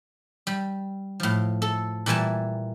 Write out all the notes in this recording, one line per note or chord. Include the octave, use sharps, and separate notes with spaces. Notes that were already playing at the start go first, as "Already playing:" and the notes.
G3
A2 F3
A4
A#2 E3 G3 G#5 A5